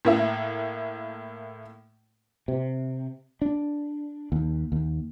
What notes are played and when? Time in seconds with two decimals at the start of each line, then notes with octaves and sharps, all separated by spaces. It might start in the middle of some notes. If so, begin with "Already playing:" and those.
0.05 A2 A#3 E4
2.48 C3
3.42 D4
4.32 D#2
4.72 D#2